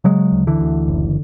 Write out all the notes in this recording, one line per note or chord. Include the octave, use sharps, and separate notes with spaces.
C#3 F#3 G#3
D2
D3 E3
D2
F#1